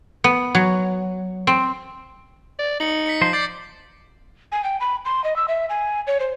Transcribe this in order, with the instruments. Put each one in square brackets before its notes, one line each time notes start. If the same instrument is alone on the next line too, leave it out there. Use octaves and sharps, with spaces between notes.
[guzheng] B3
F#3
C4
[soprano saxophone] D5
[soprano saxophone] D#4 [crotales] C#7 F#7
[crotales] B6 C#7
[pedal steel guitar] F3 C5
[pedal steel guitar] D5 [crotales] G6 A6 C7
[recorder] G#5
G5
B5
C6
D#5
E6
E5
G#5
C#5
C5